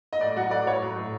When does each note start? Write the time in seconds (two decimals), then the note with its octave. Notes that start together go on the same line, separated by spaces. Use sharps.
0.13 D#5
0.21 A2 D5
0.36 F#3 F#4 F#5
0.51 A2 D5
0.67 A2 C#5
0.82 F#3
0.96 A2